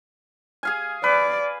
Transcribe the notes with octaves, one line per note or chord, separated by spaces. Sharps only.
G#4 F5 G#5
B4 D5